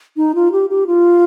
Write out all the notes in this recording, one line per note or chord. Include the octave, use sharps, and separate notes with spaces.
D#4
F4
G4
G4
F4